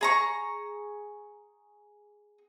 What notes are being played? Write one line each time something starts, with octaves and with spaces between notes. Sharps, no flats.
G#4 A#5 C#6